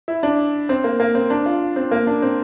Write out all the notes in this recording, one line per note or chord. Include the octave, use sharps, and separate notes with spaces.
E4
D4
C4
A#3
A#3
C4
D4
F4
C4
A#3
D4
C4